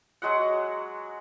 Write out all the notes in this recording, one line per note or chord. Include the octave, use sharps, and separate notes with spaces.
F#3 G#3 F#4 F#5